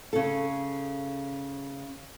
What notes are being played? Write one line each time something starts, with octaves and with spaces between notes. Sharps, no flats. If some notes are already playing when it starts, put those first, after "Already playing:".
C#3 A4